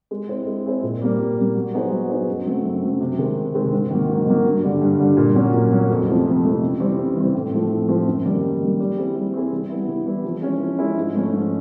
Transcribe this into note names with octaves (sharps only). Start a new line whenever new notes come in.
G#3
C4 E4 G#4 C5
G#3
C4 E4 G#4 C5
A#2
G3 A#3
A#2
G3 A#3
F#3
B3 D#4 G#4 C5
F#3
B3 D#4 G#4 C5
F#2
C#3 F#3 A3 C4
F#2
C#3 F#3 A3 C4
C3
D#3 G#3 C4
C3
D#3 G#3 C4
G#2
D#3 F#3 A#3
G#2
D#3 F#3 A#3
G2
D3 G3
G2
D3 G3
A#2
F#3 A#3 C#4
A#2
F#3 A#3 C#4
F2
C3 F3 A3
F2
C3 F3 A3
C#3
E3 G3 C4
C#3
E3 G3 C4
A2
F3 A3 C4
A2
F3 A3 C4
F#2
D#3 G3 A#3
F#2
D#3 G3 A#3
G3
C4 E4 G#4
G3
C4 E4 G#4
E3
G3 B3 E4
E3
G3 B3 E4
F3
G#3 C#4 E4 G#4
F3
G#3 C#4 E4 G#4
G#2
F3 A3 C#4
G#2